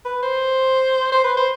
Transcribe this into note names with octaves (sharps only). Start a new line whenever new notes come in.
B4
C5
C5
B4
C5